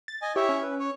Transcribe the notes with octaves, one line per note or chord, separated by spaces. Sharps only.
A6
D#5 G#5
E4 G4 C#5 E5
C#4
B4
C#5